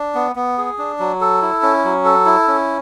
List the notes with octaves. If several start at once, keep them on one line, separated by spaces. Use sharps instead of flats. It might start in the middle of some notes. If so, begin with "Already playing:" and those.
Already playing: D4
B3
B3
G#4
D4
F#3
A4
E4
C#4
F#3
A4
E4
C#4